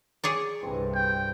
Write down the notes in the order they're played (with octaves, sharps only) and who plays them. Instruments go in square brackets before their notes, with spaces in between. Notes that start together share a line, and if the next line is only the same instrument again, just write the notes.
[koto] G#4 C#5 D5
[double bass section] C2 G2 [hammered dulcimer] E3 C4 A4
[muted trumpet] G5